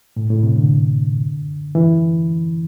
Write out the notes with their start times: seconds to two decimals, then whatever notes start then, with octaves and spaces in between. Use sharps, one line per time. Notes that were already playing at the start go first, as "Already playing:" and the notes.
0.16 A2
0.30 A2
0.43 C3
0.56 D3
1.75 E3